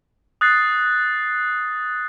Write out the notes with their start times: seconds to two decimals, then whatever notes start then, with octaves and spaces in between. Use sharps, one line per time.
0.41 D#6 F#6 A6 A#6 C7